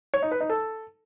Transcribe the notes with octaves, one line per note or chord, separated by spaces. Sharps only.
C#5
D#4
B4
D#4
A4